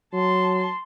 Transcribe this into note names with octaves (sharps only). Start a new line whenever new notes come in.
F#3 A5 C6